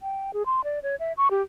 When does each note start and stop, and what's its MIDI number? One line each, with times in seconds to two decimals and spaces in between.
0.01 0.31 79
0.33 0.43 68
0.46 0.61 84
0.64 0.79 74
0.83 0.96 73
1.00 1.13 76
1.17 1.28 85
1.31 1.42 67